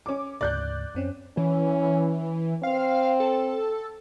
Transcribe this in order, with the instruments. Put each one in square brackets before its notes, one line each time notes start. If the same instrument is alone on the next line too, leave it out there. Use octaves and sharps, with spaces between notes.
[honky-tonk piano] C#4 D6
[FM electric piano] D2 G#2 C#3 [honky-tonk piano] D5 F#6 G6
[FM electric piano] F#2 C4 C#4
[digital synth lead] E3 [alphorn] C#4
[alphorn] C4 [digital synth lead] F5
[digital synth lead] A4